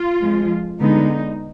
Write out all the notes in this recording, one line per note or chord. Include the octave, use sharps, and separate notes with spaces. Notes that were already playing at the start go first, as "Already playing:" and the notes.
Already playing: F4
F2 F3 G#3
D3 G#3 B3 D#4